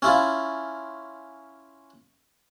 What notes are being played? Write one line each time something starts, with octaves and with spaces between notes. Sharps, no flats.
C#4 E4 F4